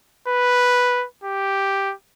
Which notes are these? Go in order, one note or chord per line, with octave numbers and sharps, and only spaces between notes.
B4
G4